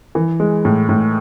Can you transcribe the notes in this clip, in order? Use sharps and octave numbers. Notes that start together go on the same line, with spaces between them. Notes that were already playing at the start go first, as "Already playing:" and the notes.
E3
G#3
A2
A2